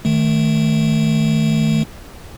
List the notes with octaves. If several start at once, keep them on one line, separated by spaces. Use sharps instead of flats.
D#3 A3